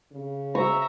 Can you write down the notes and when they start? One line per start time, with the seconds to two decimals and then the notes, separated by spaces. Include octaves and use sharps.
0.12 C#3
0.55 E5 A#5 C#6